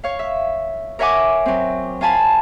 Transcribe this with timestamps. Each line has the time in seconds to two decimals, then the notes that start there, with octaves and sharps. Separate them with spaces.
0.03 C#5 F5
0.19 E5
0.99 A#4 C#5 E5 F#5 G#5 D6
1.46 F#3 C4
2.01 F4 F5 G#5 A5 B5